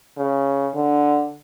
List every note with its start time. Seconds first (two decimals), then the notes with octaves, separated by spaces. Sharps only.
0.18 C#3
0.74 D3